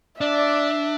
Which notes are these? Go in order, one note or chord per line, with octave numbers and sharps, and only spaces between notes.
D4 D5 E5